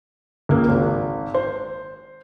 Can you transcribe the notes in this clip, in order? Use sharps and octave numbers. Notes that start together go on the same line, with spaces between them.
C#2 A#3
G#1
C5